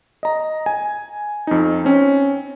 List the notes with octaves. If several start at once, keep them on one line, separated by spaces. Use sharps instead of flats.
D#5 A#5
G#5
F2 D#4
C4 C#4